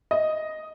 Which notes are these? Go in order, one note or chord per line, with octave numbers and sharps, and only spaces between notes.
D#5